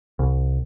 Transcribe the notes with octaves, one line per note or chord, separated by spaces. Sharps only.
C2